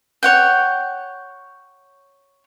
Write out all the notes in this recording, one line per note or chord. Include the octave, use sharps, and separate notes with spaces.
C#5 F#5 G5